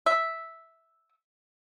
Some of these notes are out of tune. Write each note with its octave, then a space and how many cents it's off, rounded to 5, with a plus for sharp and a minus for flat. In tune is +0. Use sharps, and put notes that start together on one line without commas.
E5 -5